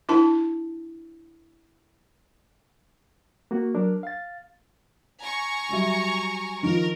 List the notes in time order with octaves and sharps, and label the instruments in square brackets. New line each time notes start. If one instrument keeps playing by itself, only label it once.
[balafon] D4 E4 A5
[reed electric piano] A#3 F#4
F#3 D4 A#4
F5 A6
[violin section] G#5 A#5 C#6
[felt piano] F#3 G3 E5
[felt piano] D#3 F3 [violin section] A#4